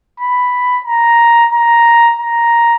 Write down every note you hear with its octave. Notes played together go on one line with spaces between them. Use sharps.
B5
A#5
A#5
A#5